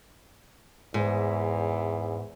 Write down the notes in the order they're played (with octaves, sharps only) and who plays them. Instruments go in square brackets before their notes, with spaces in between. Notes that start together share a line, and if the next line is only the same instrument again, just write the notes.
[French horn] E2 [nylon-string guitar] G#2